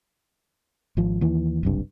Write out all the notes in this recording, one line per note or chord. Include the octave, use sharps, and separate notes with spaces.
G#1 F3
D#2 E3
F#1 C2 G2